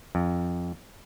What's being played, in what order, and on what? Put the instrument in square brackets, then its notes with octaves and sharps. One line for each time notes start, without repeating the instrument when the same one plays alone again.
[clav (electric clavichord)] F2